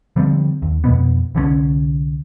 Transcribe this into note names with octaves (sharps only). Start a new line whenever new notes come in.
D3 F3 G3 C4
D#2
F2 B2 B3
C2 D3 G3 C#4